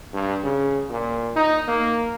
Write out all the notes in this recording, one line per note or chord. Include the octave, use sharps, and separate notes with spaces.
G2
C#3
A#2
D#4
A#3